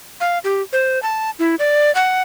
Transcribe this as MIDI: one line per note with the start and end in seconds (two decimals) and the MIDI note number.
0.20 0.39 77
0.44 0.62 67
0.73 1.01 72
1.03 1.30 81
1.39 1.55 64
1.59 1.93 74
1.95 2.22 78